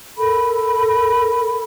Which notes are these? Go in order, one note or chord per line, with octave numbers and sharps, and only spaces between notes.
A4 A#4 B5